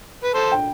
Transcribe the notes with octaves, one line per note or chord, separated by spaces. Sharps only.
B4
A4 C5
G5